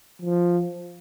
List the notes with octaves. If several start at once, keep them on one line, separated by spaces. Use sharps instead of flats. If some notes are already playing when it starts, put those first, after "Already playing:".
F3